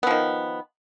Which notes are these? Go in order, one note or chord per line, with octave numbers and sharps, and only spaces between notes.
D#3 F3 B3